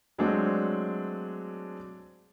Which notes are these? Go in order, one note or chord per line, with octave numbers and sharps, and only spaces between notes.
F#3 G#3 A3 C4 D4 F#4